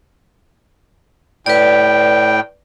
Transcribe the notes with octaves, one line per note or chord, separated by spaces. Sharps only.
A2 B4 D5 G5